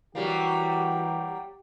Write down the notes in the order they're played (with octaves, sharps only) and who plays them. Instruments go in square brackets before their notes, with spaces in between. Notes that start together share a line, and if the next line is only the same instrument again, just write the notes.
[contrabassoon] E3 [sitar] F#3 G3 A#3 [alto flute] F#4 [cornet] G4